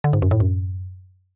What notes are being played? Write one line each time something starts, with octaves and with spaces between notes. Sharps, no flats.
D3
G#2
F#2
A2
F#2